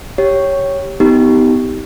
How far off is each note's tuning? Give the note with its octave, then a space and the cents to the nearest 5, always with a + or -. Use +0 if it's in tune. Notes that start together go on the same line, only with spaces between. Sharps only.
G4 +0 C#5 +0
B3 +25 D#4 +25 G4 -5